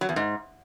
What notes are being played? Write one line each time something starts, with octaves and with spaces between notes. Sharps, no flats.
F#3
E2
G#2